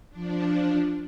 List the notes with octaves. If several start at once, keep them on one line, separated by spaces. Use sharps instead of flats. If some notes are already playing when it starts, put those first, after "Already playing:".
F3 D4